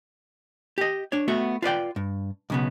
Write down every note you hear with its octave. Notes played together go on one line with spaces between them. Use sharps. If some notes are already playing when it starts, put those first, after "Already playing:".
G4 D#5
D4 C#5
A3 B3 F#4 E5
F4 B4 D5 G5
G2
B1 C#3 B3